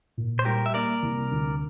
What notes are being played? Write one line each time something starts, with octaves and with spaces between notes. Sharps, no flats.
A#2
C5
G3 G4 A#4
E5
A#3 A#4 D5
C2
D2